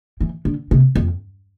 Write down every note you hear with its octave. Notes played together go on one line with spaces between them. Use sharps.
E3
D3
C3
F2